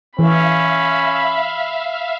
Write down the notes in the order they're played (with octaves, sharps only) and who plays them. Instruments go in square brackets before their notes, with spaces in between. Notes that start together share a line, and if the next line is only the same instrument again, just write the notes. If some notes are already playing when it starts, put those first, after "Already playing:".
[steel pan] E3 [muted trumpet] C#4 [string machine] E5 F5 [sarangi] B5